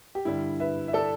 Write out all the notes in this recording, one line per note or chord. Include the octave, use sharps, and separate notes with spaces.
G4
G2 D3 G3 E4
B4 E5
E5
A4 D5